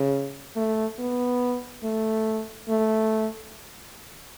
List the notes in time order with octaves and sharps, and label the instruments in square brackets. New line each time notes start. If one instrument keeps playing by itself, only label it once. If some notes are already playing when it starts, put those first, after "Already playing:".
Already playing: [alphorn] C#3
A3
B3
A3
A3